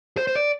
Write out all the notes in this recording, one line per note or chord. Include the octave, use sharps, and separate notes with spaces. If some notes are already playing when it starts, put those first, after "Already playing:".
C5
C5
D5